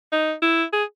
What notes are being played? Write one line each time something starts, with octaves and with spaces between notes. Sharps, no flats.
D#4
E4
G#4